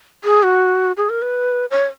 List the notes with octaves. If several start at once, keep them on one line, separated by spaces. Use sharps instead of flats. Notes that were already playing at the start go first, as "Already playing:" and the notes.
G#4
F#4
G#4
A#4
B4
C#5